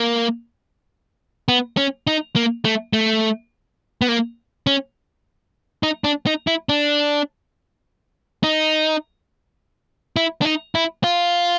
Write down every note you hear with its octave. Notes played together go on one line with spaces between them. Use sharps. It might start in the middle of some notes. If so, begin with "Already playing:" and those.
Already playing: A#3
B3
C#4
D#4
A#3
A3
A3
B3
A#3
C#4
D#4
D4
D#4
E4
D4
D#4
E4
D4
D#4
E4
F4